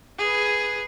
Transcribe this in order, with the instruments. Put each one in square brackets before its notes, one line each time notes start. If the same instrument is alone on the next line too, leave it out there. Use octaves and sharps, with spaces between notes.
[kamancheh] G#4 B4